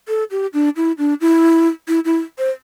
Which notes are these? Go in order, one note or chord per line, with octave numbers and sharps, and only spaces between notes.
A4
G4
D4
E4
D4
E4
E4
E4
C5